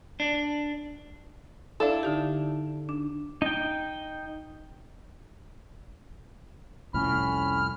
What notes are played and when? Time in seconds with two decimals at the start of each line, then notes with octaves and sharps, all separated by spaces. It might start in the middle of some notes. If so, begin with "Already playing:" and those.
0.20 D4
1.80 D4 E4 A4 F5
2.03 D3 D#4 G4
2.89 D4
3.42 D#4 G5
6.94 C2 F2 A2 C#4 B5 F6